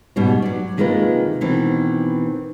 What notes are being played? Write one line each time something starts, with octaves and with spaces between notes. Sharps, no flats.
G#2 B2 G3 C#4
F#3 D5
C3 D#3 G#3 A#3 F4 B4
B2 D#3 E3 C4